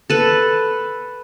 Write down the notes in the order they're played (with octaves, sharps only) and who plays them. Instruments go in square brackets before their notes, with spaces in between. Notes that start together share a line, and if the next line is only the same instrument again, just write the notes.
[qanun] A4 B4